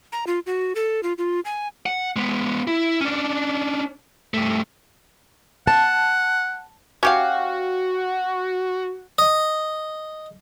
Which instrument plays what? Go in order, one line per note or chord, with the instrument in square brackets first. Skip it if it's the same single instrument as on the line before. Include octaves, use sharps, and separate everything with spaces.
[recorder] A#5
F4
F#4
A4
F4
F4
G#5
[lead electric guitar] F#5
G#3 B3
E4
C#4 D4
G2 A3
[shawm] F#5 [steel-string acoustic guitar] A5
[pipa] C#4 G4 F5 [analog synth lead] F#4
[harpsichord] D#5